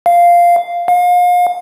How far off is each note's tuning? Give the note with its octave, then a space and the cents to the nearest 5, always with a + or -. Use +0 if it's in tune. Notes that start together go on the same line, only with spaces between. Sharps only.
F5 -5
F5 +35